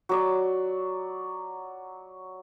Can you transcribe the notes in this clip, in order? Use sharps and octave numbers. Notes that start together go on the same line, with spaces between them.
F#3 D5